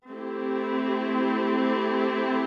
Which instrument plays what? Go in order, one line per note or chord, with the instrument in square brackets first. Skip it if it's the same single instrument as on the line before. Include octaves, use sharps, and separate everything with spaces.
[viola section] A3 C4 E4 G4